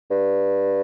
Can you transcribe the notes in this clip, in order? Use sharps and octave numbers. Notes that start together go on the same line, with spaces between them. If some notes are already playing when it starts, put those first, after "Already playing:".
G2